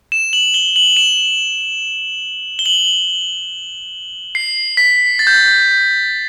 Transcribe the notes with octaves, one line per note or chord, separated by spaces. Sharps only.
E7
F#7
G7
F#7
E7
G7
F#7
C7
B6
A6
G6
A6